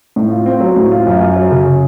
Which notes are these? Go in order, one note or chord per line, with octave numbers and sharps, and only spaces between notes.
A2
F4
C4
F#3
A2
F4
F#2
F#2
F#3
C#3